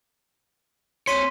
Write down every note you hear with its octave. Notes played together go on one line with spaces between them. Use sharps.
C4 C#5 C6 B6 D#7